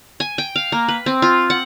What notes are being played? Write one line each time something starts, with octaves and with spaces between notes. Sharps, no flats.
G#5
G5
F5
A#3
B4
C4
F4
F#5